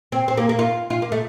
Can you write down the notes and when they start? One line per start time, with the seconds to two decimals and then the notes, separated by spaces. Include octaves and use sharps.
0.12 C4
0.28 C4
0.37 A#3
0.49 A#3
0.59 F4
0.90 F4
1.02 A#3
1.12 A3